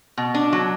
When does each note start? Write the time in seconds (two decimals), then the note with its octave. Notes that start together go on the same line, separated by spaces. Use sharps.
0.18 B2
0.34 D4
0.53 F#3